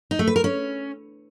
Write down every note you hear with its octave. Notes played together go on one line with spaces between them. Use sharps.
D#4
A3
B4
A#4
C#4